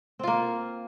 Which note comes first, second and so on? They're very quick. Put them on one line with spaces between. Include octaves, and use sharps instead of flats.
C4 F4 A#3